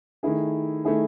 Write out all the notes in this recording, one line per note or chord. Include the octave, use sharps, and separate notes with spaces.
D#3 A3 E4 G#4
D#3 A3 E4 G#4